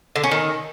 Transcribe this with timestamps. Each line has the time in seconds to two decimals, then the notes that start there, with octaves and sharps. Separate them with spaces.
0.16 D3
0.23 C#4
0.31 D#3